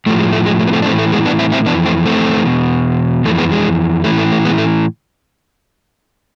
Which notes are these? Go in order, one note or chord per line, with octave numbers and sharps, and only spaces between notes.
A2 F3 A3
G#3
A3
G#3
A3
B3
A3 C4
D4
A2 E3 A3 C4
A3
G#3 B3
B3 D4
C4 E4
C4 E4
F2 E3 B3 D4
A3 C4
A3 C4
E2 B2
F2 E3 A3
G#3 B3
G#3
A2 E3 A3
A3
A3
G#3 B3
A3